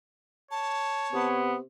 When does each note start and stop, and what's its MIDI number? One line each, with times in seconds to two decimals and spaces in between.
0.51 1.43 73
0.51 1.28 81
1.13 1.62 48
1.13 1.57 59